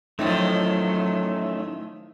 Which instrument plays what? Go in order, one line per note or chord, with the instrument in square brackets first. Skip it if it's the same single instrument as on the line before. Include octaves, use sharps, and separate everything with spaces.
[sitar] A2 D#3 F3 [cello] F#3 [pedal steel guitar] A3 [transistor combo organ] C#4 D#4 E5